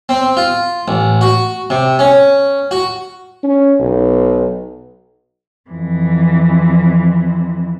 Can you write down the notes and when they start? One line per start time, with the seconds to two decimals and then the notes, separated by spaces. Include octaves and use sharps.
0.09 C4
0.37 F4
0.88 A1
1.21 F#4
1.70 C3
1.99 C#4
2.71 F#4
3.44 C#4
3.80 B1
5.71 F2 E3